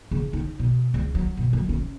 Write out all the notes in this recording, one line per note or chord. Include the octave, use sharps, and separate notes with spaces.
C#3
D#4
B2
C#2
F#3
B2
F#3
C#4